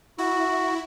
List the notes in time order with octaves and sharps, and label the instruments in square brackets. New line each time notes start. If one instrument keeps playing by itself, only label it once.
[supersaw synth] E4 [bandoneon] F#4